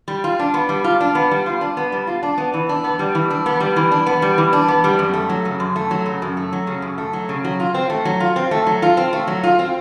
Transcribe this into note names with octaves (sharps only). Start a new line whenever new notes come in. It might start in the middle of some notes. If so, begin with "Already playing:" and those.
G3
F4
D4
B3
G3
F4
D4
B3
G3
F4
D4
B3
G3
F4
D4
B3
E3
D4
B3
G3
E3
D4
B3
G3
E3
D4
B3
G3
E3
D4
B3
G3
F#2
A3
F#3
C#3
F#2
A3
F#3
C#3
F#2
A3
F#3
C#3
F#2
A3
F#3
C#3
F#3
F4
C4
A3
F#3
F4
C4
A3
F#3
F4
C4
A3
F#3
F4
C4